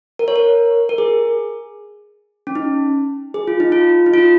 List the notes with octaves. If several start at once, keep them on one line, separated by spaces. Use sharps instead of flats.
A#4
C#5
A#4
A#4
G#4
C#4
D#4
G#4
F4
D#4
F4
D#4
F4